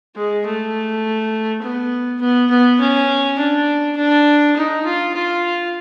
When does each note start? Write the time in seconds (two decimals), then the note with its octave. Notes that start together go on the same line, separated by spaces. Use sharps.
0.16 G#3
0.46 A3
1.62 B3
2.21 B3
2.50 B3
2.80 C#4
3.39 D4
3.97 D4
4.56 D#4
4.85 F4
5.14 F4